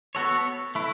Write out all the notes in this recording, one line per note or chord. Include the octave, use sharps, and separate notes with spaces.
B3 F#4 A4 C#5
A3 E4 B4